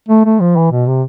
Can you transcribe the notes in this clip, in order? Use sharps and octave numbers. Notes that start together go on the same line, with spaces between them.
A3
A3
F3
E3
B2
C3